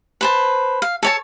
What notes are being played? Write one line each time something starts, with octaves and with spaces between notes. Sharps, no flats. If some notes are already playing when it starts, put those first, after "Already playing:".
B4 C5 A5
F5
A4 C#5 A5